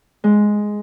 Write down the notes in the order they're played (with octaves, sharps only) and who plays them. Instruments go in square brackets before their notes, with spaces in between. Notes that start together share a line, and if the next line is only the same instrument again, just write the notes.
[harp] G#3